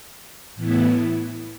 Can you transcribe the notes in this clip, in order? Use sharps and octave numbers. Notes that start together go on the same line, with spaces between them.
A2 E3 B3 E4